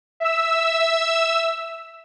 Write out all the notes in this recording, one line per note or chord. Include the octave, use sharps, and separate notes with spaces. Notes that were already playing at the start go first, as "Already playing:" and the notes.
E5 E6